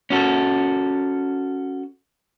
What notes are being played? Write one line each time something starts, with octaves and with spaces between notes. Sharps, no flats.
C#4 F#4 A4